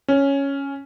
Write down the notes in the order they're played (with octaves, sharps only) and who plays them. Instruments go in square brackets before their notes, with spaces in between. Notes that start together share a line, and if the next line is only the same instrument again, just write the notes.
[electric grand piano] C#4